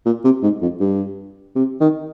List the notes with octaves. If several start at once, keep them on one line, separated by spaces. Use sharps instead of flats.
A#2
C3
G#2
F2
G2
C3
D#3